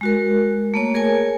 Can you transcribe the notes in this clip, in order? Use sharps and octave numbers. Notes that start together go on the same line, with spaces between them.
G#3 F#4 A#4
A3 A#3 C#5
G#4 A#4 C#5 G#5